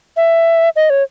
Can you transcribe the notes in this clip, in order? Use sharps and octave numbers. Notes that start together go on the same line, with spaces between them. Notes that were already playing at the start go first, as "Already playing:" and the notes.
E5
D#5
C#5